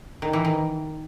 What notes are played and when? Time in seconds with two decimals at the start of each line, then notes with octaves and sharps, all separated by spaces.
0.22 D#3
0.33 E3
0.45 D#3